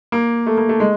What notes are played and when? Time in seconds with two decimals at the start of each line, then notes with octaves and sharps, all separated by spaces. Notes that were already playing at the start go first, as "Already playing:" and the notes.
0.12 A#3
0.47 A3
0.58 A#3
0.69 A3
0.80 G#3